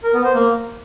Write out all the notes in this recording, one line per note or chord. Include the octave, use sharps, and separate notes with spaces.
A#4
B3
C5
A#3